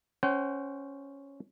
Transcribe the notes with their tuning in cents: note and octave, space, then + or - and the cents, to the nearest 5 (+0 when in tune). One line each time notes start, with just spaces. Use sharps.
C#4 +0 C5 +0 F#5 +45